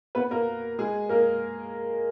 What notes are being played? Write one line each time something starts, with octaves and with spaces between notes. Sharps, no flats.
B3 B4
A#3 A#4
G#3 G#4
A#3 A#4